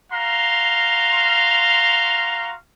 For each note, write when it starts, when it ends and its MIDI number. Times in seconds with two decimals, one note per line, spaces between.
0.12 2.52 66
0.12 2.52 77
0.12 2.52 82
0.12 2.52 84